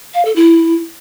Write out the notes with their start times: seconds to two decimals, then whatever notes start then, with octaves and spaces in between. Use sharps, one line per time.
0.14 F5
0.25 A4
0.36 E4